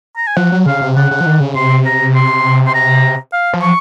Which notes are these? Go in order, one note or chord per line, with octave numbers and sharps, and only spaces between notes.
A#5
G#5
F3 F#5
F#3
C#3 F5
C3
C#3 F#5
C#3
F3
D#3
C#3
C3 C6
A#5
C6
C6
A#5
F5
F3
C#6